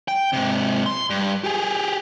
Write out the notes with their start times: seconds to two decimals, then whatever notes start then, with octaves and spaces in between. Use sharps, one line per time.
0.08 G5
0.33 G#2 C3
0.86 C6
1.10 G2
1.44 G4 G#4